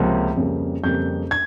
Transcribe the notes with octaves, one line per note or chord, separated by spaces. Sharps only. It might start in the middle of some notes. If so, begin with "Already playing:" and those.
Already playing: C#2 C3 F3 A#3
F2 C#3 G3 A#3
F2 C#3 G3 A#3 G6
G#6